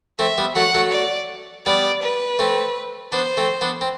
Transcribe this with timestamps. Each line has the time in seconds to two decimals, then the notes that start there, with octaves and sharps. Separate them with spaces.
0.19 A3 C4 E5
0.38 G3 B3
0.55 F#3 A3 F#5
0.74 F#3 A3
0.92 D5
1.66 G3 B3 D5
2.02 B4
2.39 A3 C4
3.12 B3 D4 C5
3.37 A3 C4
3.61 B3 D4
3.81 C4